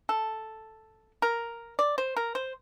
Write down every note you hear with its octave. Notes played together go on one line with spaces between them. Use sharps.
A4
A#4
D5
C5
A#4
C5